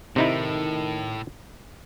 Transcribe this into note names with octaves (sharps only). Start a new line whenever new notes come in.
A2 C3 D#3 D#4 E4